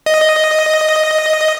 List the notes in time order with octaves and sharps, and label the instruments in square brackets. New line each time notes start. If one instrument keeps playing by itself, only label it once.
[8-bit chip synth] D#5